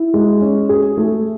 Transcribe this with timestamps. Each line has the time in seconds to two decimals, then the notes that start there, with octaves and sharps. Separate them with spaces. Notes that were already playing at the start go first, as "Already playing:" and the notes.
Already playing: E4
0.14 G#3
0.42 C#4
0.69 G#4
0.97 A3